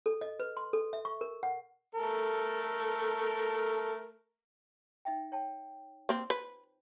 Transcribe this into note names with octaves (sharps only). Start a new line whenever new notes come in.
A4
D#5
B4
C6
A4
E5
C#6
A#4
F#5
A3 A4 A#4
D#4 E5 G5
C#5 G5 A5
A#3 C4
B4